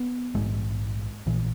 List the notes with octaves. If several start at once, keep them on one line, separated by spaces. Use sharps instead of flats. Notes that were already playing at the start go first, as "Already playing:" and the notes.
Already playing: B3
A#1 G#2 G#3
A#1 A#2 E3